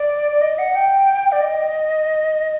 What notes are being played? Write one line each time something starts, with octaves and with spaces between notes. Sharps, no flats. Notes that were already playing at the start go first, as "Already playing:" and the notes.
Already playing: D5
D5
D#5
F#5
G5
D5
D#5